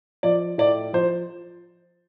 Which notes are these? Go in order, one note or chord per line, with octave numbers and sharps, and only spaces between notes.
F3 D5
A2 D5
F3 C5